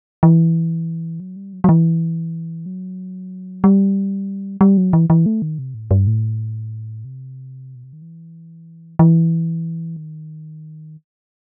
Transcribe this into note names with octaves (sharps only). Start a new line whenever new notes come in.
E3
F#3
G3
F#3
F#3
E3
F#3
G3
G3
F#3
E3
E3
A3
D#3
C3
A2
G2
A2
C3
B2
C3
D#3
E3
E3
D#3